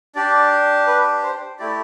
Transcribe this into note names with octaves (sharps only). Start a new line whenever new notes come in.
D4 G4 D5
B4
C5
A3 E4 G4 D5